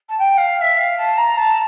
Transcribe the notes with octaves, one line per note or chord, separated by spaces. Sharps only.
A5
G5
F5
F5
E5
F5
A5
A#5
A5